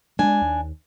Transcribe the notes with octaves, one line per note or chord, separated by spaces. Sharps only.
G3 G#3 D4 G#5
D#2